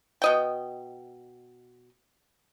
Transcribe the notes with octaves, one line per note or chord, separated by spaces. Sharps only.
B2 D#5 G5